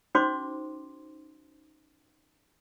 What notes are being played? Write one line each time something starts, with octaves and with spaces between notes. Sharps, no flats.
C#4 D#4 F#4 C5 C6 D6